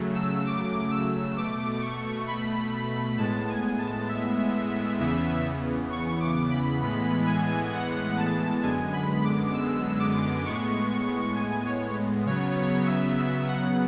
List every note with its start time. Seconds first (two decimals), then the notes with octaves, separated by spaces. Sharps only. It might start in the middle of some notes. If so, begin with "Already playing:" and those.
Already playing: C#3 F#3 A3
0.15 E6
0.45 D6
0.91 E6
1.36 B2 A3 D6
1.82 C#6
2.27 B5
2.72 B5
3.18 A2 G#3 B3 A5
3.49 G#5
3.78 A5
4.09 E5
5.00 E2 C#3 E3 B3 E5
5.90 C#6
6.20 D6
6.51 B5
6.81 A2 E3 G#3 B3 B5
7.26 G#5
7.72 F#5
8.17 A5
8.63 F#2 D3 G#3 B3 G#5
8.93 B5
9.23 D6
9.53 E6
9.99 D6
10.44 A2 G#3 B3 C#6
11.35 G#5
11.65 C#5
12.26 C#3 F#3 B3 C#5
12.57 C#5
12.87 E5
13.17 E5
13.48 F#5